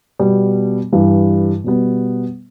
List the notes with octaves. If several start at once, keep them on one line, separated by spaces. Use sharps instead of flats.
B2 G3 B3
G2 E3 G3
B2 G3 B3